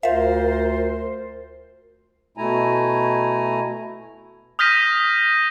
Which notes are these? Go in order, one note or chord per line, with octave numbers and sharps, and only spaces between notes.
D2 F4 A#4 C5 E5 F5
B2 A3 E4 G#5 A#5
D#6 F6 G6 A#6 B6 D#7